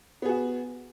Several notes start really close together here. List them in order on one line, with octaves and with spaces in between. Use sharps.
B3 G#4 F#4